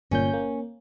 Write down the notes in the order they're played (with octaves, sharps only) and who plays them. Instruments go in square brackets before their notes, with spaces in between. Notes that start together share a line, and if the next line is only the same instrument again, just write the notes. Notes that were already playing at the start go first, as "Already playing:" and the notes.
[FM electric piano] G1 A#2 G6 [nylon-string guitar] C#4
[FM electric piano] A#3